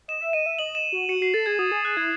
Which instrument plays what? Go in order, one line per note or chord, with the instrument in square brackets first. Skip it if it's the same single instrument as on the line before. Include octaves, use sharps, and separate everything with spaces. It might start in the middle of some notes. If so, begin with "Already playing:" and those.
[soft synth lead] D#5 [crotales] E7
[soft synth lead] E5
[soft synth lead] D#5 [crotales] D#7
[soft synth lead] E5
[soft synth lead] D#5 [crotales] F#7
[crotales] E7
[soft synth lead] F#4
[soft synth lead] F#4 [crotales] C#7
[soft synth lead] F#4 [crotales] C7
[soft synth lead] A4 [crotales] A6
[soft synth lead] G#4 [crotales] G#6
[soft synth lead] F#4 [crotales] D#6
[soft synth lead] G#4 [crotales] D#6
[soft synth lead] G#4 [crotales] F#6
[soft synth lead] E4 [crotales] G#6